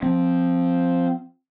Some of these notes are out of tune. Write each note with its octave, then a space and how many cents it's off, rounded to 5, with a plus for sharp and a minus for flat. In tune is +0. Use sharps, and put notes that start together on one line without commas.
F3 +0 C4 +0